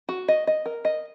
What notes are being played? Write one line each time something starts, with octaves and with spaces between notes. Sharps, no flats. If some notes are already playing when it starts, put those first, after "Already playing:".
F#4
D#5
D#5
A#4
D#5